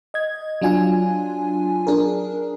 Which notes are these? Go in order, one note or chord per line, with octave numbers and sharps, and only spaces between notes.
D#5 G#6
F#3 D4 F4 G#5
D4 G#4 A#4